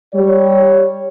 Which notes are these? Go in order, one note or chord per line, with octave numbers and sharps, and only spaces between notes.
G3 C#5